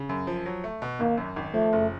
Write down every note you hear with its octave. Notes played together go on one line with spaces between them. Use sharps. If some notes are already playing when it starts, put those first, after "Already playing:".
Already playing: C#3
F#2
F3
F#3
A3
B2
G#1 A#3
F#2
G#1
F3 A3
F#1